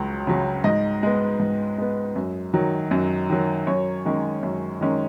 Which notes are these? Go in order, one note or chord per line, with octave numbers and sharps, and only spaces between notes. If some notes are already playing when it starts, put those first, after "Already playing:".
Already playing: C#2 C#3 F#3 C#4
C#3 F#3 C#4
G#2 D#5
G#3 B3
G#2
G#3 B3
F#2
D#3 F#3
F#2
D#3 F#3
F#2 C#5
D#3 G#3 C#4
F#2
D#3 G#3 C#4